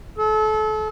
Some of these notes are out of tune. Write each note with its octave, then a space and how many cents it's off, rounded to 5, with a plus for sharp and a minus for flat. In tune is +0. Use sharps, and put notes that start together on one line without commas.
A4 -30